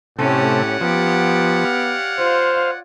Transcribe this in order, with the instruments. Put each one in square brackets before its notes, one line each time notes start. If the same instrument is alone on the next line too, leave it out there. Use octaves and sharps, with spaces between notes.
[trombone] A2 [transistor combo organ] C3 A3 [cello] C#4 G4 [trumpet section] C#5 D5 F#5
[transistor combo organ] F3 [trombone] B3 [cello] G4
[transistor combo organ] F5
[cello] F4 [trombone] C5